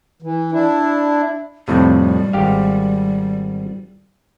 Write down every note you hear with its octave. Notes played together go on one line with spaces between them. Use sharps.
E3
D4 E4
F2 A2 C3 G3
G#1 G4 F5